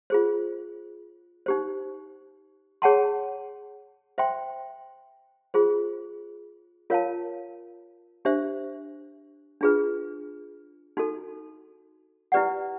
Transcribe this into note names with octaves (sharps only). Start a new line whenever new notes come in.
F4 G#4 C5
D#4 G4 C5
G#4 C#5 F#5 A5 C6
C5 E5 G5 C6
F4 G#4 C5
F4 A#4 C#5 F5 A5
D4 G4 C5 E5
D4 F4 G#4 B4
D#4 F#4 A4
E4 G4 B4 D5 F#5